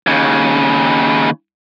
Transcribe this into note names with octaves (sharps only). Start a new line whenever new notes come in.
D#2 C#3